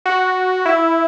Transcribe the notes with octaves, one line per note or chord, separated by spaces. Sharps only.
F#4
E4